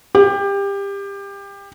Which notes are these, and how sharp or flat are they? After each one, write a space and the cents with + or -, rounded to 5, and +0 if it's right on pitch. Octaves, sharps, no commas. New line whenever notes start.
G4 +25